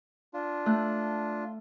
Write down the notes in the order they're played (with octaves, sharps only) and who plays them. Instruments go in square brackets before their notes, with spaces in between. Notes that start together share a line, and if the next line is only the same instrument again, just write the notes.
[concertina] D4 F4
[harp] A3 F#6